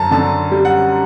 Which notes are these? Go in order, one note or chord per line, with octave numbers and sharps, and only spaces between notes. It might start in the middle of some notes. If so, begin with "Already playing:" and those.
Already playing: F#2 D3 A5 A#5
D3 A5
G3
F#5